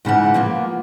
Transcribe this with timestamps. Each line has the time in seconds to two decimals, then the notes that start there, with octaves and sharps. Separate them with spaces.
0.05 G#2 C#3 E3 F#5
0.34 F3 A#3 B3